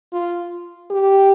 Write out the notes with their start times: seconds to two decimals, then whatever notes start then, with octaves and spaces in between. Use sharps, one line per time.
0.13 F4
0.90 G4